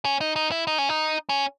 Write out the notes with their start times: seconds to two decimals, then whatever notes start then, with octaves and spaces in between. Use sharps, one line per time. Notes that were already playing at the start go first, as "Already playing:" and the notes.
0.05 C#4
0.21 D#4
0.36 D#4
0.52 E4
0.67 D#4
0.78 C#4
0.89 D#4
1.29 C#4